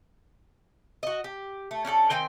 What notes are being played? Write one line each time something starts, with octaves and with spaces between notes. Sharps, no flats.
F#4 D#5
G4
A3
C#4 D4 F#4 A4
D#3 C4 G5 G#5